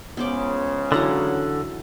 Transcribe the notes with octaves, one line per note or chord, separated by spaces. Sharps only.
C#2 C#3 B3 C5 D6
D3 E3 F#3 F#5